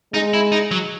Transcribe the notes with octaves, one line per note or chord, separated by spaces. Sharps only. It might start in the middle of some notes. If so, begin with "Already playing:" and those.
G#3 D#4
E4
D#4
F#3